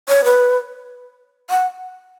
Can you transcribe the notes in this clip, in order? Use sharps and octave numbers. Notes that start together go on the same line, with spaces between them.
C#5
B4
F#5